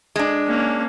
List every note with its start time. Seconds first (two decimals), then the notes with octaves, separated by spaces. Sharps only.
0.16 G#3 D4
0.48 A#3 C#4